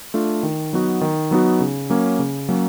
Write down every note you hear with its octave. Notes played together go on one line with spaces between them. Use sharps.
A3 D4 F4
D#3
F#3 B3 D#4 F#4
D#3
F#3 B3 D#4 F#4
C#3
F#3 A#3 C#4
C#3
F#3 A#3 C#4